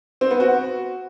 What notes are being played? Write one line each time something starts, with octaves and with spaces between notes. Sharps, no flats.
C4
B3
F#4